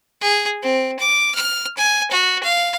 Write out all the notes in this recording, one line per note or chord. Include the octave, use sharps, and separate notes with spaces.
G#4
C4
D6
F6
G#5
F#4
F5